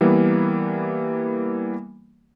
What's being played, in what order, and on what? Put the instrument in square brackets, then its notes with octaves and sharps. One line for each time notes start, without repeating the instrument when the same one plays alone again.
[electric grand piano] E3 G3 A#3 B3